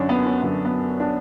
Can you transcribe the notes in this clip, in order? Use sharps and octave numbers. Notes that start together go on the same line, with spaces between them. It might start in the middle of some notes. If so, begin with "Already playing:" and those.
Already playing: F#2 D3 F#3 C#4 D4
B3
C#4
F#2 D3 F#3 B3
B3
D4